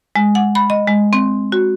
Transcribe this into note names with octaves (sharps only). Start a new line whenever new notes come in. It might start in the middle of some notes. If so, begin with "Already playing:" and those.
G#3
F#5
B5
D#5
G#3
C4
F#4